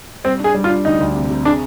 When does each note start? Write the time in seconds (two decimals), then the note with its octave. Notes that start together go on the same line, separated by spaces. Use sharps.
0.24 G3 C4
0.40 D4 G#4
0.54 G3
0.64 F4
0.70 D4
0.85 D2 D#4
1.00 D2
1.15 C3
1.30 C3
1.45 D4 G#4